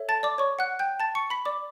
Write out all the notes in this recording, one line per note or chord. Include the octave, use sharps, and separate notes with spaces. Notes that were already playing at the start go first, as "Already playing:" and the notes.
Already playing: A4 C#5 E5
A5 A6
D5 D6
C#5 C#6
F#5 F#6
G5 G6
A5 A6
C#6 C#7
B5 B6
D5 D6